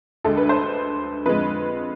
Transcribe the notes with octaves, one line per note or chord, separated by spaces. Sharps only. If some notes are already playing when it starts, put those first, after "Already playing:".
D2 D3 G#3 A4
B4
C5
F2 D3 G#3 B4